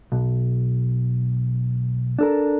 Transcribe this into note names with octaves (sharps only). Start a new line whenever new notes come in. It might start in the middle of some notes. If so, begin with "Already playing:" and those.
B1
D4 A4 A#4